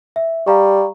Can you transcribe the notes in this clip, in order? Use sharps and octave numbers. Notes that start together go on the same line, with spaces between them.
E5
G3 F5 A#5 C#6